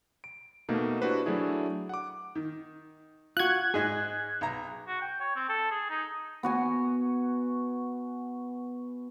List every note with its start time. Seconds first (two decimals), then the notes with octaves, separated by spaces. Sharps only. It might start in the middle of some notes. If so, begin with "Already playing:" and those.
0.24 D7
0.69 B2 A3 A#3 D#4
1.01 D4 E4 F#4 G4 B4 C5
1.26 F#3 A3 D4 E4 G#4
1.89 F#5 D6
2.35 D#3
3.37 F4 F#4 F#6 G#6
3.74 G#2 G#4 D#5
4.41 B1 A#5
4.88 F#4
5.01 G5
5.21 C#5
5.36 C4
5.49 A4
5.71 G#4
5.90 D#4
6.43 B3 F#4 G#5